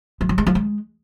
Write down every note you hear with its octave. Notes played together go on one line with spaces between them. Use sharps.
F3
F#3
G#3
F3
G#3